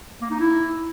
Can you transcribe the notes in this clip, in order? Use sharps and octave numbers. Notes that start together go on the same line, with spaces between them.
A#3
D#4
E4